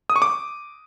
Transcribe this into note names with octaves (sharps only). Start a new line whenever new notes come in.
D#6
C#6
D6